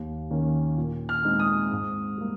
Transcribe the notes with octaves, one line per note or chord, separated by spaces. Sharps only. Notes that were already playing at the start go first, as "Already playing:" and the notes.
Already playing: D#2
D#3 A#3 C#4
A#2
F6
G#3 C4 D#4
D#6
G#2
G3 A#3